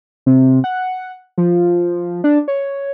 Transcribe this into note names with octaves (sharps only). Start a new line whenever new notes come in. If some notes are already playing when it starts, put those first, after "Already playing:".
C3
F#5
F3
D4
C#5